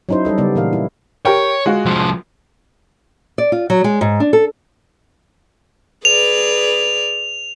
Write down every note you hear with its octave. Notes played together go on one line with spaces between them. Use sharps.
F#3 C#4 D#4 E4 C5
G3 D#4 A4 D#5
C#3 G3 B3 D5
A#2 E3 A#4 F5
E4
G4 A#4 C#5 G5
G#3 F4 F#4
C2 F3
D5
F4
F#3
G#3
G#2
D4
A4
G#4 B4 D5 F7